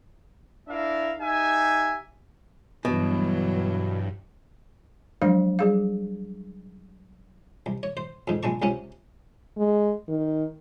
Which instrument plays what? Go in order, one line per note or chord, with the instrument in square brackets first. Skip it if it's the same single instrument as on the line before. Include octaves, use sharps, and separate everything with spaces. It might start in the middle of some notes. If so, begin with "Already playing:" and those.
[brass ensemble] D4 E4 A#4 E5 F5
D#4 G4 E5 G#5
[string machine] G2 [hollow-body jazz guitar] B2 [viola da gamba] E3 F#3
[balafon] F3 F#3 G#3 D4 F5
G3 G#4 F5
[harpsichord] C2
C#5
C5
F2 G#2
A#1 G#3 A5 C#6
C#2 C3 C#4 F#5
[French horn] G#3
D#3